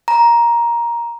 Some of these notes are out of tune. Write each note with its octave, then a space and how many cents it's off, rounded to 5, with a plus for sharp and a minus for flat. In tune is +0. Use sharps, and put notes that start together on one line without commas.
A#5 +10